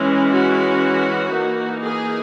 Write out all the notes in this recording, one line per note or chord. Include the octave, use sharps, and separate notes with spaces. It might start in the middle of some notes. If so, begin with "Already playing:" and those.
Already playing: E3 G#3 C#4
F#4
E3 A#3 D#4
G#4